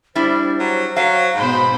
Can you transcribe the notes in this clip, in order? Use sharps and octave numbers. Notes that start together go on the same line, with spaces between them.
G3 D4 E4 C5
F#3
F#3 F5
G#2 B2 C5 B5